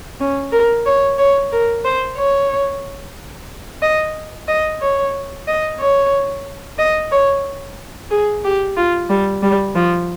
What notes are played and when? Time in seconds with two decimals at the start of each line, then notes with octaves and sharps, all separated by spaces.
0.20 C#4
0.52 A#4
0.86 C#5
1.18 C#5
1.52 A#4
1.85 C5
2.17 C#5
3.82 D#5
4.48 D#5
4.82 C#5
5.47 D#5
5.80 C#5
6.79 D#5
7.12 C#5
8.11 G#4
8.44 G4
8.77 F4
9.10 G3
9.43 G3
9.75 F3